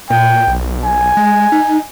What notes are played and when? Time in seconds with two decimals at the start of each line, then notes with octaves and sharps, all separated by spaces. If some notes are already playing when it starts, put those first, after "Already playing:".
0.10 A#2 G5
0.47 B1
0.83 G#5
1.17 G#3
1.52 D#4